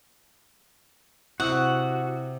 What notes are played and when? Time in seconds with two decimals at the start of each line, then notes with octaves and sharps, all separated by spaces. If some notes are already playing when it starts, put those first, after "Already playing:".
1.40 C3 E4 F#4 F#5 D#6 E6